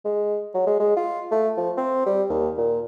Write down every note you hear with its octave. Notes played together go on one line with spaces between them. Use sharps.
G#3
F#3
G#3
G#3
F4
A3
F3
C4
G3
D#2
A#2